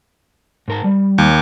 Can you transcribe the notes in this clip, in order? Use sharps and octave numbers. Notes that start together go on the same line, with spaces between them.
G#2 A#4 A5
G3
D#2